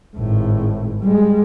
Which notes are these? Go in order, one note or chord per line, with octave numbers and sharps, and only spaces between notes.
G#1 A2
G3 G#3